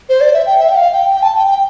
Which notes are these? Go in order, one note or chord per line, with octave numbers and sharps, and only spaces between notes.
C5
D5
E5
G5
E5
G5
F5
G5
G5
A5
G5
G5